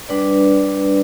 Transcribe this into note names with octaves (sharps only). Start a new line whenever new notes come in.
G3 D4 B4 D5